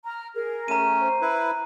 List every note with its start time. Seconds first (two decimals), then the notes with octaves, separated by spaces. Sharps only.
0.04 A#5 F6
0.34 G#4 A#4
0.68 A3 C#4 A#5 D#7
0.99 C5
1.22 E4 B4